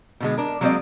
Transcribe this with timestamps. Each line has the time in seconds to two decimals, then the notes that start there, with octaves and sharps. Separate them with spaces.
0.20 B2 D3 G#3
0.38 D4 A#4
0.61 F#3 G#3 A#3 C4 D5 D#5